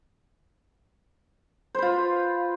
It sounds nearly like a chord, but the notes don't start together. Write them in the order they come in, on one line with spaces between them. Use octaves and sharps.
C5 B4 F4